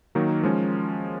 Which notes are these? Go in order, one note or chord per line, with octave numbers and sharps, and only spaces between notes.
D#3 F#3 A#3 D#4 A#4
F3 G#3 C#4